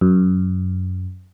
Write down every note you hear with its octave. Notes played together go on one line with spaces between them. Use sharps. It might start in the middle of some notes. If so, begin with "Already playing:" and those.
F#2